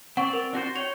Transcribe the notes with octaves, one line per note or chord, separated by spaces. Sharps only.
C4 D5 F#5 C#6
A#4
D4 F#4 C5
C#5 G5 F7